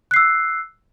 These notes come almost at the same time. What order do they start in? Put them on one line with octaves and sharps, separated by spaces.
F#6 C7 E6